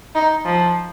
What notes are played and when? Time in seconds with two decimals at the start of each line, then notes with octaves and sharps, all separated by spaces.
0.15 D#4
0.45 F3